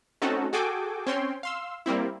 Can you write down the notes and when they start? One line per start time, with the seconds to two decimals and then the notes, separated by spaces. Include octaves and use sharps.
0.22 A3 C4 C#4 D#4 F#4 A4
0.53 F#4 G#4 A4 G5 G#5 D6
1.07 C4 C#4 C#5 G5 C6
1.43 F5 C6 E6
1.86 G3 A#3 C4 E4